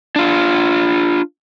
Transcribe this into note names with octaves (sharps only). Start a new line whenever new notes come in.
D4 F4